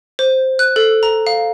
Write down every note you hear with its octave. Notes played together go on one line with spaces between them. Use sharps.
C5
F#6
A4
A#5
F5